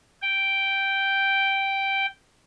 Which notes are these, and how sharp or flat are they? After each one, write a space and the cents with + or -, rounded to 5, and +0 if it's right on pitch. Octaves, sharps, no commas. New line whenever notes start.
G5 -5